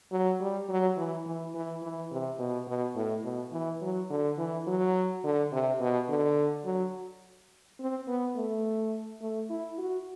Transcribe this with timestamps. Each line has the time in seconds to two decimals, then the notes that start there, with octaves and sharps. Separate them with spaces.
0.11 F#3
0.41 G3
0.69 F#3
0.97 E3
1.26 E3
1.54 E3
1.83 E3
2.11 C3
2.39 B2
2.67 B2
2.95 A2
3.24 B2
3.52 E3
3.81 F#3
4.10 D3
4.38 E3
4.67 F#3
5.24 D3
5.52 C3
5.80 B2
6.09 D3
6.65 F#3
7.80 C4
8.07 B3
8.36 A3
9.21 A3
9.50 E4
9.78 F#4